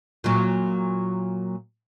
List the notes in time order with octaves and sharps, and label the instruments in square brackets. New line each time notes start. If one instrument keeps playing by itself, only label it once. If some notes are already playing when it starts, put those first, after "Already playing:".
[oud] A#2 F#3